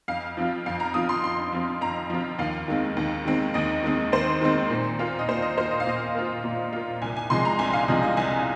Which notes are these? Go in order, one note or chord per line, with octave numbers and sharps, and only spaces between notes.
F2 F5
F3 C4 F4
F2 F5
A#5
F3 C4 F4 D#6
C6
F2 C6
F3 C4 F4
F2 A#5
F3 C4 F4
D#2 F5
D#3 G#3 C4
D#2
D#3 G#3 C4
D#2 D#5
D#3 G#3 C4
D#2 C5
D#3 G#3 C4
A#2
A#3 F4
D#5
A#2 C5
D#5
A#3 F4 C5
D#5
F5
A#2 D#5
A#3 F4
A#2
A#3 F4
C2 G#5
G#5
C3 F3 G#3 C6
A#5
C2 G#5
F5
C3 F3 G#3 D#5
D#5
C2 G#5